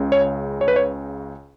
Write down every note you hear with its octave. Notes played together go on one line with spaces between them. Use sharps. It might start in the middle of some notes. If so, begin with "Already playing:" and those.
Already playing: C#2 C#3
C#5
C#5
B4
C#5